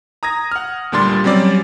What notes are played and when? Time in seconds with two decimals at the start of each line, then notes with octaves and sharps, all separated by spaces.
0.23 A#5 D#6 G#6 A#6
0.51 F#5 F6
0.92 D2 A#2 G3 D4 C6 A6
1.24 F#3 G3 C4 C#4 D5